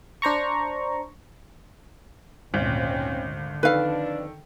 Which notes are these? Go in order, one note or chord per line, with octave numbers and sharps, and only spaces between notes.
D4 C5 A#5 C#6
G#1 D2 A#2 C4 C#4
D3
F2 D#3 D4 A4 B4 F5